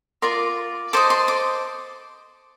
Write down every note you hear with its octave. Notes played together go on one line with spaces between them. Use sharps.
F4 A#4 D5 C6
A4 C5 D#5 D6
C6
D6